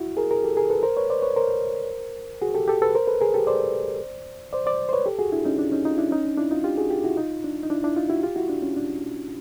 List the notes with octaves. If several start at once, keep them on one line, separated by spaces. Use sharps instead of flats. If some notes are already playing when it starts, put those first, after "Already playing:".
Already playing: E4 F#4
G#4 A#4
G#4 A#4
G4 A4
G#4 A#4
A4 B4
A#4 C5
B4 C#5
C5 D5
B4 C#5
A#4 C5
F#4 G#4
G4 A4
G4 A4
A4 B4
A#4 C5
A4 B4
G#4 A#4
G4 A4
C5 D5
C5 D5
C5 D5
C5
B4 C#5
G4 A4
F#4 G#4
D4 E4
C#4 D#4
D4
C#4 D#4
D#4 F4
D4 E4
C#4 D#4
D4
D4 E4
D#4 F4
F4 G4
F#4 G#4
F4 G4
E4 F#4
D#4 F4
D4
D#4
D4 E4
D4 E4
D#4 F4
E4 F#4
F4 G4
E4 F#4
D4
C#4
D4